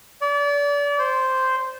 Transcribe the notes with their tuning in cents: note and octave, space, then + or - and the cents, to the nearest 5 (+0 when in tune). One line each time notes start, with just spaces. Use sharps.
D5 -35
C5 -5